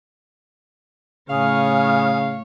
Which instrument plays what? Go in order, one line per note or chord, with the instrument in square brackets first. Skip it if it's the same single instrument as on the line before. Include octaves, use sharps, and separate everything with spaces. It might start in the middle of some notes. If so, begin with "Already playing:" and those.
[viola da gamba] A2 C#5 [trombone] C#3 [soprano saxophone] F5 [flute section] G#5 D#6 F6